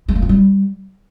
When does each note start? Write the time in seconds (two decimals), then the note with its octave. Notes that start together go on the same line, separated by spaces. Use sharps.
0.08 G#3
0.15 A3
0.22 F4
0.29 G3